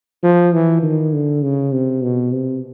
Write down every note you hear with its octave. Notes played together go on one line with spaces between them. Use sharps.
F3
E3
D#3
D3
C#3
C3
B2
C3